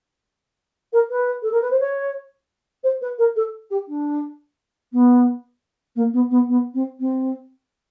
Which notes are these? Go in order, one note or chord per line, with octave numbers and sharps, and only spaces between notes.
A#4
B4
A4
A#4
B4
C5
C#5
C5
B4
A#4
A4
G4
D4
B3
A#3
B3
B3
B3
C4
C4